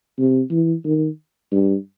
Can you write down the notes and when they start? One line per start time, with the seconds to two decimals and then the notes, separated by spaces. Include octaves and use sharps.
0.18 C3
0.51 E3
0.84 D#3
1.52 G2